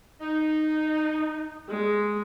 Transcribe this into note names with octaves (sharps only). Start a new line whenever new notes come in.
D#4
G#3